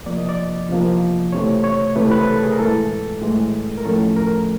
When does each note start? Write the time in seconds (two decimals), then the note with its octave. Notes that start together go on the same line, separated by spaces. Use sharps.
0.06 E2 C3 F3 A#3 D5
0.17 D#5
0.29 D5
0.69 E2 C3 F3 A#3
1.33 C#2 C3 E3 A3 C#5
1.64 C#5
1.96 C#2 C3 E3 A3 B4
2.11 B4
2.27 A4
2.43 G#4
2.52 A#4
2.59 A2 E3 G#3 A4
3.22 A2 E3 G#3
3.78 A#4
3.85 A2 F3 A3 C#4 A4
4.16 A#4